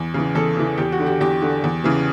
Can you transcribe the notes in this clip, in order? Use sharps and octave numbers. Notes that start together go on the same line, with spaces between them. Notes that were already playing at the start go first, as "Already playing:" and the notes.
Already playing: E2
C#3 E3
E2 A4
C#3 E3
E2 G4
F#4
D3
G4
E2 G4
D3
E2
C#3 E3